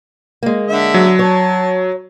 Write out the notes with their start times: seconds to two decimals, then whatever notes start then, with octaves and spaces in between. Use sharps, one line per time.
0.43 G#3 A#3
0.68 D3 E5
0.94 F#3
1.19 C#5 A5